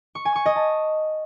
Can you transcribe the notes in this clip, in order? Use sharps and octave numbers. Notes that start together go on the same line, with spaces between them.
C#6
G#5
C#6
D#5
A5